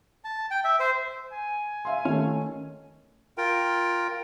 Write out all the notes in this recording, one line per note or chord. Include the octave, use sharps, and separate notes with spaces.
A5
G5
E5
C5
G#5
E5 F5 C6
D#3 A3 C#4
F4 A#4 G5